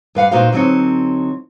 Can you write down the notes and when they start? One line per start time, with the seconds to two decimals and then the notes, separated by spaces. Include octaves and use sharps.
0.15 G2 B4 F5 F#5
0.31 A#2 D#4 F#4 C5 F5
0.52 D3 F#3 C4 D#4 C#5